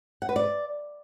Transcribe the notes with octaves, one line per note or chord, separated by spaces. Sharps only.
F#5
B4
D5